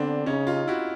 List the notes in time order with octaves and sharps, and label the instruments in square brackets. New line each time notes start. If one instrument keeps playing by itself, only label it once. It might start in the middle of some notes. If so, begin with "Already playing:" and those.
Already playing: [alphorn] D3 [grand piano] B3 C4 D4
[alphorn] C#3 [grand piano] C#4 D#4
[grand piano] D#4 F4
E4 F#4